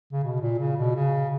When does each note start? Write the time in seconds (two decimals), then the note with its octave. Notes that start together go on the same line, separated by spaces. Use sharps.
0.12 C#3
0.24 B2
0.41 A#2
0.59 C#3
0.77 B2
0.95 C#3